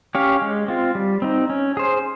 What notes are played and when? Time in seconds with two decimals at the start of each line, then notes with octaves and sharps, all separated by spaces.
0.15 C#4 G4 C#5 F5
0.42 G#3
0.68 C4 F4
0.95 G3
1.22 C4 D#4
1.50 C#4
1.77 G#4 C5